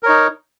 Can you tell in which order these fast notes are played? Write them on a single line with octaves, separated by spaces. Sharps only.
A#4 C#5 D#4